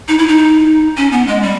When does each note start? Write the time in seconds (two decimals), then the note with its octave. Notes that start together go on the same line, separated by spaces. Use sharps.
0.08 D#4
0.18 E4
0.28 D#4
0.97 C#4
1.12 B3
1.27 G#3
1.42 G3